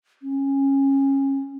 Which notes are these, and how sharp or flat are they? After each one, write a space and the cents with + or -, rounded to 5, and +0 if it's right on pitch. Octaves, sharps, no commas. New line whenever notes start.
C#4 -20